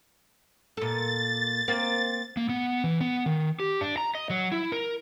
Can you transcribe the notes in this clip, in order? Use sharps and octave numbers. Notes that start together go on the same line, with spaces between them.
A#2 A4 A6
A#3 C4
A#3
B3
E3
B3
D#3
G4
D4
A#5
D#5
F#3
E4
A#4